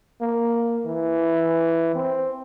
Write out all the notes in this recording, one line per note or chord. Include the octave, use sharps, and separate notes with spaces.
A#3
E3
C4